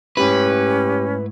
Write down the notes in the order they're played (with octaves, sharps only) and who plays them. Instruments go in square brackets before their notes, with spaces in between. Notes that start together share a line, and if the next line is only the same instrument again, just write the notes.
[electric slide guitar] G#2 A3 E4 [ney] C#4 [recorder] G4 [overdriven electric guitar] B4